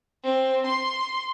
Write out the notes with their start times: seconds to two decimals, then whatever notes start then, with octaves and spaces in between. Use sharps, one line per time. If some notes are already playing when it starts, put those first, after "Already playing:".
0.24 C4
0.66 C6